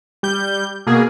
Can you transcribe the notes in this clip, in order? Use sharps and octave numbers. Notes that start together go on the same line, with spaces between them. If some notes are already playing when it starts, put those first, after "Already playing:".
G3 G6
B2 A#3 G#4